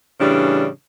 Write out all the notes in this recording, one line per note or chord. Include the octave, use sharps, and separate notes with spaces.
A2 C#3 E3 G3 D4